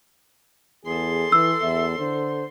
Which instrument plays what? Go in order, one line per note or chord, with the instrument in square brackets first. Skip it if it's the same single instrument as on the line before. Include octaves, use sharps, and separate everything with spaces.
[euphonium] E2 [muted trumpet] G#4 [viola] A4 C6
[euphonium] E3 [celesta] E6
[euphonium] E2 [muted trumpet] E5
[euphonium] D3 [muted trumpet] C5